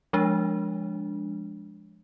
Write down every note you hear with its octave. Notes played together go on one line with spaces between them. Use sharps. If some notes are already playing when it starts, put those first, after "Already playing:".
F3 G#3 D4